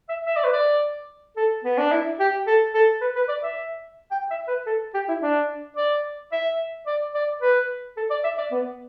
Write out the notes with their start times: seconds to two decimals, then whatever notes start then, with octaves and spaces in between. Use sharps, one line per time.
0.09 E5
0.27 E5
0.36 D5
0.44 B4
0.53 D5
1.37 A4
1.65 B3
1.78 D4
1.92 E4
2.20 G4
2.47 A4
2.74 A4
3.01 B4
3.16 B4
3.29 D5
3.43 E5
4.11 G5
4.31 E5
4.48 B4
4.67 A4
4.94 G4
5.09 E4
5.22 D4
5.77 D5
6.32 E5
6.87 D5
7.15 D5
7.42 B4
7.97 A4
8.10 D5
8.24 E5
8.38 D5
8.52 B3